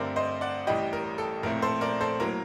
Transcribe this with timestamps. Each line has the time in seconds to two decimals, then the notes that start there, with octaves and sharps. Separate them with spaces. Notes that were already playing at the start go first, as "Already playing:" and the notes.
Already playing: G2 D3 A3 C4 A#4 D5
0.16 C5 D#5
0.41 D5 F#5
0.67 A1 A2 G3 D#5 G5
0.93 A#4
1.18 A4
1.43 A#1 A2 A3 C4 A#4
1.62 A4 C5
1.81 A#4 D5
2.01 A4 C5
2.20 A2 F#3 A#3 A#4